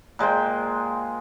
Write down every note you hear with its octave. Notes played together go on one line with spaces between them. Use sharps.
A#2 G#3 C5 G5